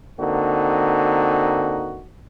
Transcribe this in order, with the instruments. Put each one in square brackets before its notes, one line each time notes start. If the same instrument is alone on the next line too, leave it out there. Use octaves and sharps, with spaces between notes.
[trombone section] D3 A#3 C4 D#4 F#4